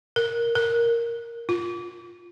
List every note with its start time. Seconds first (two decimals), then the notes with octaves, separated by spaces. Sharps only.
0.16 A#4
0.55 A#4
1.49 F4